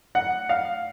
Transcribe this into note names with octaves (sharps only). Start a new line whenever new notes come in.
F#5
F5